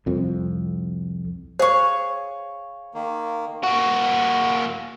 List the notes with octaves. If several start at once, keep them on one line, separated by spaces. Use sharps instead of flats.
C2 F2
G#4 C5 C#5 F5 C#6
D#3 A#3
A#3 F#4